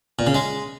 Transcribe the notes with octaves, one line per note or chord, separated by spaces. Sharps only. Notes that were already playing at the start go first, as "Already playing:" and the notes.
A#2
C#3
G#3